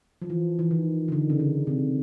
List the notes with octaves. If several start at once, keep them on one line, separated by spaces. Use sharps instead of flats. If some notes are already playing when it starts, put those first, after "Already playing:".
F3
E3
E3
D#3
D#3
D3
C#3
D3
C3